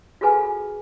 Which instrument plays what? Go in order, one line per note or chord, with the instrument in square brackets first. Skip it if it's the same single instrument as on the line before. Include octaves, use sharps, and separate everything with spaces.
[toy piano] F4 F#4 G#4 A4 B4 G#5